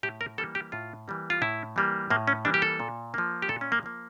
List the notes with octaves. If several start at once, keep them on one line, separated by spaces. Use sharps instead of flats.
A2 G4
A#4
E3 G3 A#3 A4
G4
A2 F4
E3 G3 A#3
F4
A2 E4
E3 G3 A#3
A2 A#3
C#4
E3 G3 A#3 D4
G4
A4
A#2
F3 A#3
G4
A#2 A4
C#4
A#3
F3 A#3